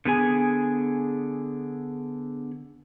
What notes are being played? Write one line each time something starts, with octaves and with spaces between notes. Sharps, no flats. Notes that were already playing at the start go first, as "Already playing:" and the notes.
D3 B3 G#4 G#5